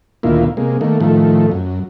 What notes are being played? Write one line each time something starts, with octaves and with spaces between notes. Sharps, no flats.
D2 A#2 D#3 A#3 E4 F4
C3 G#3 A#3
D#3 A3 A#3
A2 D#3 F3 A3
F#2